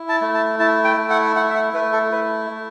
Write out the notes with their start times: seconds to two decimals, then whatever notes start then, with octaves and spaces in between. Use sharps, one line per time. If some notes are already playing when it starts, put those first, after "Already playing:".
Already playing: E4
0.09 A5
0.21 A3
0.34 A5
0.59 E4 A5
0.84 G5
0.97 A3
1.10 F#5
1.36 E4 F#5
1.50 E5
1.55 F#5
1.73 A3 B4
1.93 A4
2.12 E4 B4
2.50 A3